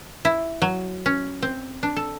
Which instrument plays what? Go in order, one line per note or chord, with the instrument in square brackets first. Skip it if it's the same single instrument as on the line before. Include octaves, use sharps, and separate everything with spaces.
[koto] E4
F#3
C#4
C4
D4
A4